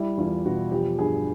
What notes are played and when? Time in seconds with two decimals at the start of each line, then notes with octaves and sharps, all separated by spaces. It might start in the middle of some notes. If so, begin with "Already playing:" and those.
Already playing: G3 E4
0.17 E2 F4
0.46 B2 F#4
0.72 F3 G4
0.99 G2 G#4